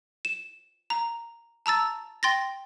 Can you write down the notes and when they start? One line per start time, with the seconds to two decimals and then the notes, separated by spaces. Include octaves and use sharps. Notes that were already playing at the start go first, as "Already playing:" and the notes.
0.25 E7
0.90 A#5
1.66 A5 A#5 E6 A6
2.23 G5 C6 A6 A#6